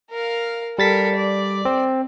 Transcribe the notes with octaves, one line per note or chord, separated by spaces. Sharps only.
A#4 F5
G3 A4 A#4 A6 B6
D5
C4